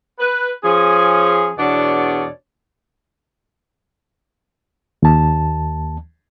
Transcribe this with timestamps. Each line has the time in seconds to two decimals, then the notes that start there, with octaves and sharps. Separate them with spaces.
0.19 B4
0.64 F3 C#4 G#4
1.58 E2 B2 D4 C#5 D5
5.02 D#2 A5